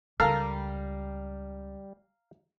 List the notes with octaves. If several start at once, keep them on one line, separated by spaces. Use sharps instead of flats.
C#2 G3 F4 A4 A#4 F5 A#5